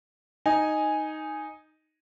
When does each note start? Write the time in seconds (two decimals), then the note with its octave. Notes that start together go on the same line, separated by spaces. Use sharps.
0.46 D#4 G#5